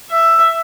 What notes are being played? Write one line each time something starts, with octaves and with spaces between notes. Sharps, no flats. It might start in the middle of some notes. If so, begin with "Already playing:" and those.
E5